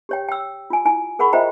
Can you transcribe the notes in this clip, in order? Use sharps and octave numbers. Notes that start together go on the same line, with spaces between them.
G4 C#5 G5
G5 E6
F4 G#5
E4 G#5
G#4 A#4 F#5 B5 C#6
F4 C5 D#5 E5 G5 A#5